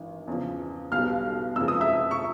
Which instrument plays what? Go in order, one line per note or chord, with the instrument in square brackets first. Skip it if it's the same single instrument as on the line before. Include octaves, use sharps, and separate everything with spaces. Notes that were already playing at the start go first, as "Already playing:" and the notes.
Already playing: [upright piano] G#1 G2 E3
E2 C#3 F3
B1 B2 G3 F5 F6
F1 F2 C#3 F3 G#3 E6
D#6
E5 E6
C#6